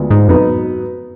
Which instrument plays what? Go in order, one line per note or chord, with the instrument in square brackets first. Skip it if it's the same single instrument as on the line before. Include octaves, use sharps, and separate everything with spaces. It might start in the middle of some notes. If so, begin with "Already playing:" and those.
Already playing: [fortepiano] D2 F3 G#3 B3
[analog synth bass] G#2
[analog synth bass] F2 [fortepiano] B2 F#3 B3 D#4